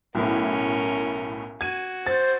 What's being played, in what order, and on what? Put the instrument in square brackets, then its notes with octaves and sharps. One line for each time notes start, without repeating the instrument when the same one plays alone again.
[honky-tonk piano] B1 A2 E4 [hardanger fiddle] C#4 A#4
[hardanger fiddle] F#4 [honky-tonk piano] G#6 D#7
[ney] C5 [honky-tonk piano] A6